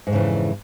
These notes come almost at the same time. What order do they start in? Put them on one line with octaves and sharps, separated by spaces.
G#2 F2 C#3 E3